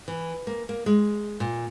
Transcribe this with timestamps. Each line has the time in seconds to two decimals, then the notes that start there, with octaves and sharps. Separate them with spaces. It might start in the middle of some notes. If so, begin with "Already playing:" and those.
0.08 E3
0.47 A#3
0.69 A#3
0.86 G#3
1.40 A#2